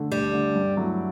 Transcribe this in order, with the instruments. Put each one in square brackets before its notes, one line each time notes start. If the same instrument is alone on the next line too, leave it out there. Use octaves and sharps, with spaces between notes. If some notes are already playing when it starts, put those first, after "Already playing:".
Already playing: [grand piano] D3 A3
[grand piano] D2 [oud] G3
[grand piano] D3 A3
G2
F#3 A3 E4